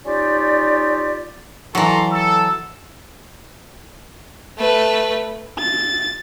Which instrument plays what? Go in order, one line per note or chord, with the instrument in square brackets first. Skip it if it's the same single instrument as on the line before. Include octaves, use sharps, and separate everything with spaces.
[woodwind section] C#4 D#4 F4 G4 D5
[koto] E3 F#3 [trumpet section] A4 A#5 C6
[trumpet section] A4 [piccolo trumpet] E6
[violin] A3 B4
[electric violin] A6